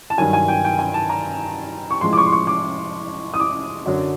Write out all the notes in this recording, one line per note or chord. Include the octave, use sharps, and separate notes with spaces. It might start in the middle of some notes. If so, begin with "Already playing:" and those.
A5
G2 D#3 F#3 G#5
G#5
G5
G5
G#5
A5
A#5
C#6
A2 F3 G#3 C6
D6
C#6
C6
C#6
D6
D#6
D6
F#2 D3 F#3